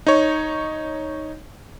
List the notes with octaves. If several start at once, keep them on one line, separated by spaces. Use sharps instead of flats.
D#4 C#5